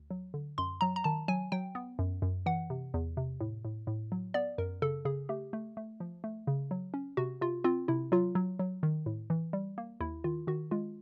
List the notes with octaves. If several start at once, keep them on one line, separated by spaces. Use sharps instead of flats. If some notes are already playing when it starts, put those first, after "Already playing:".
Already playing: D2
F#3
D3
F#2 C6
F#3 A#5
A#5
D#3 A5
F#3 G#5
F#3 G5
B3
F#2
F#2
E3 F#5
C3
E2
C3
A2
A2
A2
F#3
B3 D5
F#2 A#4
C#3 A4
C#3 G#4
A3 G4
A3
A3
F3
A3
C#3
F#3
C#4
C3 F#4
C3 F4
C4 F4
C3 E4
F#3 F4
F#3
F#3
D#3
A2
E3
G3
A#3
D#2 E4
D#3 F4
D#3 F#4
G#3 F4